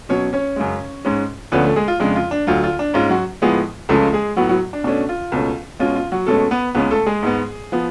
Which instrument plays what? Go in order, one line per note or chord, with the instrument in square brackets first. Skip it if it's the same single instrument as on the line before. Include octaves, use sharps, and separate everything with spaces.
[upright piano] B2 F#3 C#4 C#5
C#4 C#5
F#2 C#3 G#3
G#2 G#3 C#4
D2 D3 F3 A3 B3 C#4 B4
A3 A4
G#3 G#4
F4
F2 C#3 G#3 D4
F4
D4
D2 D3 F#3 F4
F4
D4
G#2 G#3 C#4 F4
F#3 F#4
A2 F3 G#3 B3 G#4
C#2 C#3 F3 G#3 A3 C#4 A4
G#3 G#4
A2 F#3 B3 F#4
F#3 F#4
D4
B2 A3 C#4 D4
F4
C#2 B2 A3 C#4
B2 G#3 C#4 F4
F4
F#3 F#4
B2 G#3 A3 C#4 A4
B3 B4
C#2 C#3 G#3 B3 C#4 B4
A3 A4
G#3 G#4
G#2 G#3 B3
F3 B3